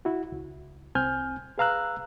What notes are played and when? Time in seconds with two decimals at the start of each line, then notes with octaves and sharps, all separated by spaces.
0.05 E4 F#4
0.32 C#2
0.95 C2 C4 G#5 F6 G6
1.58 G#4 B4 F5 A#5 E6 F#6